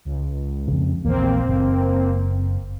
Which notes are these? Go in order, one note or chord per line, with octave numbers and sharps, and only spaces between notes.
C#2
F2 C#3
A#1 E2 A#3 C4
F#1